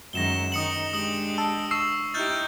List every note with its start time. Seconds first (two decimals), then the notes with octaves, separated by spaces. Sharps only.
0.13 F#2 D#3 G#3 A#6 E7 G7
0.52 D#3 D#4 D#6 C#7 F#7
0.93 G#3 D4 G4 D#6 C#7 F#7
1.38 A5 E6
1.71 C#6 E6 C7
2.14 D#4 E4 G4 F6 G6 A6